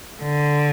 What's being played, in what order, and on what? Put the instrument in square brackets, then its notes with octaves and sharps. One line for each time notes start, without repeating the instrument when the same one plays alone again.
[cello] D3